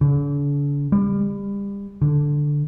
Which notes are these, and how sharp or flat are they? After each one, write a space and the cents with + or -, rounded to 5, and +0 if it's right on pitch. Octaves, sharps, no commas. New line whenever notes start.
D3 -45
G3 +30
D3 +0